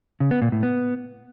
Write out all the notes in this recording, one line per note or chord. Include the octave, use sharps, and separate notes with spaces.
C#3
B3
A#2
A2
B3